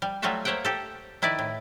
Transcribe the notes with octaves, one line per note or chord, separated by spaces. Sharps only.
G3
F#3 G3 A3 F4 F#4 E5
A#3 C5 C#5 E5 F#5 G5
G4 A4
D#3 E4 B4 D5
A2